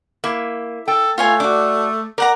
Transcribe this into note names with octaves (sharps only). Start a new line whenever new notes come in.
A#3 E4
A4 G5
A3 F4 C#5 G#5
D4 F#4 D6
A#4 D5 F#5 A#5